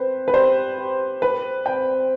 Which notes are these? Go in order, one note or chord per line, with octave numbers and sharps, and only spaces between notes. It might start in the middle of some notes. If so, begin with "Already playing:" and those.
Already playing: C4 B4 C5
B4
G4 C5
G4
B4 C5
C4 G5